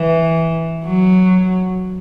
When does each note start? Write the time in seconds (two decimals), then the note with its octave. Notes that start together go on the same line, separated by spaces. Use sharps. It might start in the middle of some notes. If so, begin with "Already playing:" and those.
Already playing: E3
0.84 F#3